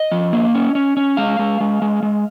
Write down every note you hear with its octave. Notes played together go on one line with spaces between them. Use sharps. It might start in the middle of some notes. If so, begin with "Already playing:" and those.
Already playing: D#5
F3
A#3
C#4
C#4
C#4
G#3 F5
G#3
G#3
G#3
G#3